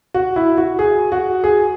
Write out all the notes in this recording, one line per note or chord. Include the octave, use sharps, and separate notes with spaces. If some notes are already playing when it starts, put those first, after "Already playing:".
F#4
E4
F#4
G#4
F#4
G#4